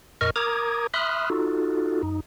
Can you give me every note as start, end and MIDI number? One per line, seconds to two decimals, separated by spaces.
0.21 0.30 41
0.21 0.30 46
0.21 0.30 70
0.21 0.30 75
0.21 0.30 85
0.21 0.30 89
0.36 0.87 70
0.36 0.87 82
0.36 0.87 86
0.36 0.87 87
0.36 0.87 92
0.94 1.29 76
0.94 1.29 83
0.94 1.29 84
0.94 1.29 87
0.94 1.29 89
0.94 1.29 90
1.30 2.02 63
1.30 2.02 65
1.30 2.02 66
1.30 2.02 69
2.03 2.20 42
2.03 2.20 63